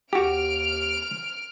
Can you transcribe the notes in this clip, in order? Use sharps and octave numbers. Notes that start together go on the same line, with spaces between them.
D#2 F#4 G4 F6 D7